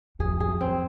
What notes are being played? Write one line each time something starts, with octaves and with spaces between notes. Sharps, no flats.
F2 G#4
G#4
C4